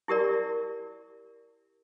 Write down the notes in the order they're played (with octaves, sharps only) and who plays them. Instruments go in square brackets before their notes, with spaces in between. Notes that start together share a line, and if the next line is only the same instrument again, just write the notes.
[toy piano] E4 G4 A#4 D5